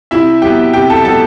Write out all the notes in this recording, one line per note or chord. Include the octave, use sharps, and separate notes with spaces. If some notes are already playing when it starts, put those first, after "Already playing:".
C3 E4 E5
F#3 B3 G4 G5
C3 G4 G5
A4 A5
F#3 B3 A4 A5